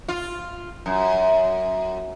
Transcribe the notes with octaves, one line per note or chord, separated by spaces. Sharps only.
F4
F#2